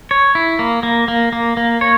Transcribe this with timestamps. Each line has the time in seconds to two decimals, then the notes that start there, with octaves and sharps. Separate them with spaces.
0.11 C#5
0.35 E4
0.59 A#3
0.83 A#3
1.08 A#3
1.33 A#3
1.57 A#3
1.81 C#5